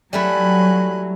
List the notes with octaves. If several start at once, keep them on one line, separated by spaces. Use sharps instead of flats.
F#3 G3 A3 E4 G#5 B5 F#6